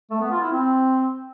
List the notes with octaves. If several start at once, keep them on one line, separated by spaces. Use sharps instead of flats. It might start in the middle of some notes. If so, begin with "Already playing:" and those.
A3
B3
F4
E4
C4